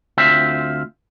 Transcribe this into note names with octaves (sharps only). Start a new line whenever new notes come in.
D2 C4 F4 E5